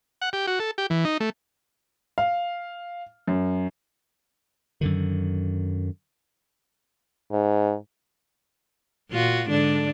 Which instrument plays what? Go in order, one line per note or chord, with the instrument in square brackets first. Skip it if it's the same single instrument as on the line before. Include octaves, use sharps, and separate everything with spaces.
[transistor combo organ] F#5
G4
F#4
A4
G4
E3
D#4
A3
[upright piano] F5
F#2
[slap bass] F#2 D3 D#3
[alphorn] G#2
[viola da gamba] A#2 F4 F#4
G#2 D3 D4